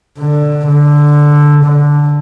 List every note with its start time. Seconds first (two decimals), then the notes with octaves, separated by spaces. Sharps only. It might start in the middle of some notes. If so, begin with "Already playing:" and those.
0.18 D3
0.67 D3
1.64 D3